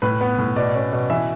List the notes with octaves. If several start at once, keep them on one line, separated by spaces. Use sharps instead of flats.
A2 B4
B3
A2
B2 D5
C#4
B2
E3 E5